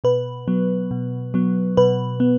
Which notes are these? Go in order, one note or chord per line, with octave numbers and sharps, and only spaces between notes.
B2 B4
F#3 B3
B2
F#3 B3
B2 B4
B3